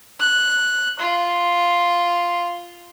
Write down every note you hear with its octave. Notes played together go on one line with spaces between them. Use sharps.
F#6
F4